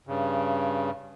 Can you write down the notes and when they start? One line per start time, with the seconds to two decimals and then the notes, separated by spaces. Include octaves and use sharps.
0.07 G2 C#3